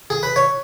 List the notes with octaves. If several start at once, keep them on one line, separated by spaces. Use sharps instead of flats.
G#4
B4
C#5